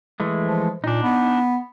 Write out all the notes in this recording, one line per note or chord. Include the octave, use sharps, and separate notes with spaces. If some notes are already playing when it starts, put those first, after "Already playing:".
E3 G#3 A3
F3
A#2 D4 D#4
B3